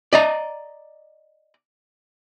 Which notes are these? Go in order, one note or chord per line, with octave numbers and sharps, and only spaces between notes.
D5 D#5 A#5